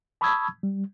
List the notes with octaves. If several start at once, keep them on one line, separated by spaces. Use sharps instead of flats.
A5 B5 C#6 D#6 E6 G#6
G3